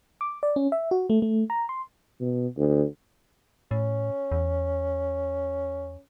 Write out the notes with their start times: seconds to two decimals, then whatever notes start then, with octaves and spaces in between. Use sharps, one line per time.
0.21 D6
0.43 D5
0.56 C#4
0.72 E5
0.91 F#4
1.10 A3
1.22 A3
1.50 A#5
1.69 C6
2.20 B2
2.57 D2
3.71 A2 C#4
4.32 E2